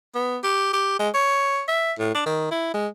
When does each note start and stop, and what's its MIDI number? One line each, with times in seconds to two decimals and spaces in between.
0.15 0.38 59
0.43 0.73 67
0.73 0.95 67
0.99 1.09 56
1.14 1.62 73
1.68 1.93 76
1.99 2.12 45
2.15 2.22 62
2.26 2.47 51
2.51 2.71 64
2.74 2.87 56